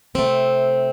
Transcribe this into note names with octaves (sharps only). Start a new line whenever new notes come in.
C3 A3 C4